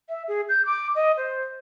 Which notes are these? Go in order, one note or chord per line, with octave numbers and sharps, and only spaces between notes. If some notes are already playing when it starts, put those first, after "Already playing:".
E5
G#4
G6
D6
D#5
C5